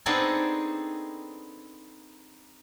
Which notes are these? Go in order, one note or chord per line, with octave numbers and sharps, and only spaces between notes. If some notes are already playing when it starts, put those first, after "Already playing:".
B3 C4 D4 D#4 G#4 A4